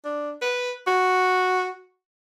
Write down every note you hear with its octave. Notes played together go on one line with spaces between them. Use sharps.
D4
B4
F#4